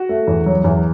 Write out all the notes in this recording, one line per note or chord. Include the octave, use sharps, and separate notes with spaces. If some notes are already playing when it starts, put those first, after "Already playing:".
Already playing: F#4
A3
E2
F#3
E2